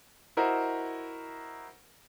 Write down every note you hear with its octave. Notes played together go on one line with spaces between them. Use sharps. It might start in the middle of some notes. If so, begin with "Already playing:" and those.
E4 F#4 A#4 C5 D#5